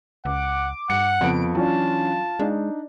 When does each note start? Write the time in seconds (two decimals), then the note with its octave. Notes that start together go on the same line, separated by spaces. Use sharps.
0.25 C#2 F#5 D6
0.90 G2 F#5 C#7
1.21 F2 C#3 F3 B3 D7
1.55 E3 F#3 C#4 D4 F4 A5
2.40 G#3 D4 D#4